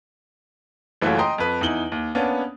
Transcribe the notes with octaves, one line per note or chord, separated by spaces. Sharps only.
F#1 E3 A3 F4 F#4 C#5
D#5 G5 A#5 C6 D#6
F2 B4
E2 D#4 E4 F#7 G7
D#2
A#3 B3 C#4 D4